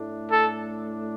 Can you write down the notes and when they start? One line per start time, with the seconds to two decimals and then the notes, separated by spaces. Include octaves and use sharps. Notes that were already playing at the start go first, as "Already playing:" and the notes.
Already playing: A2 A3 D4
0.32 A4